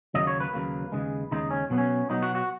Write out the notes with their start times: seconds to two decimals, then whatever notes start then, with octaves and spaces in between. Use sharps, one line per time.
0.14 D#2 C#3 F#3 A#3 D#5
0.27 C#5
0.40 B4
0.54 D#2 C#3 F#3 A#3
0.92 D#2 C#3 G#3
1.31 D#2 C#3 G#3 D#4
1.51 C#4
1.70 B2 F#3 B3
1.78 C#4
2.09 B2 F#3 B3 D#4
2.22 F#4
2.35 F#4